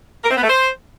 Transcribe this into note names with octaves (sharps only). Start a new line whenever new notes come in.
A#4
C4
B3
A3
C5